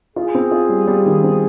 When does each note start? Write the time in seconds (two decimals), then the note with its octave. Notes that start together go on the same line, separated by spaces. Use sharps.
0.16 F4 G#4
0.35 C4
0.51 F4
0.69 G3
0.87 G3
1.06 D#3
1.23 C4